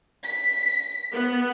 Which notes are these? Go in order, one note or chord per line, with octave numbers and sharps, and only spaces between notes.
B6
B3